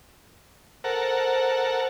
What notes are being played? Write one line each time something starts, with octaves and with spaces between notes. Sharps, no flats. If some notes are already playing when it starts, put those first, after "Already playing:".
A4 A#4 C5 F#5